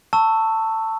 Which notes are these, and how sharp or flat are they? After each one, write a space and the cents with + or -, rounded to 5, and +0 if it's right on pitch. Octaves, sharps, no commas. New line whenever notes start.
A5 +20 C#6 +0 E6 -5